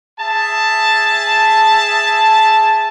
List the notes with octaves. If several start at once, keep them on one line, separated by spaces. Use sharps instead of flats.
G#4 E5 A5